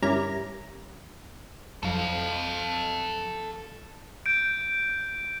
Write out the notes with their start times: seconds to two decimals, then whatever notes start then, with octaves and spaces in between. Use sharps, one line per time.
0.02 G1 G3 C#4 E4 A#4 A#5
1.83 F2 F#3 A4 F5
4.26 G6 D7